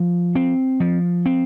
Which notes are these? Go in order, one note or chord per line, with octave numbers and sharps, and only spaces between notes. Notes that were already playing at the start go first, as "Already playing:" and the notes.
Already playing: F3
C4
F3
C4